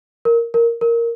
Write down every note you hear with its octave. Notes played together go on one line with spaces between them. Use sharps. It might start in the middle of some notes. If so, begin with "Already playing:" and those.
A#4
A#4
A#4